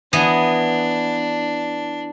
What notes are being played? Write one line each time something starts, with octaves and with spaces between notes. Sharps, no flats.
E3 B3 D4 D#5